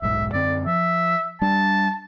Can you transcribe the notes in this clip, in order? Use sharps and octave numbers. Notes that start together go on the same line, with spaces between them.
D#1 B1 G#2 E5
F#2 D3 C4 D5
F3 E5
G3 D4 A5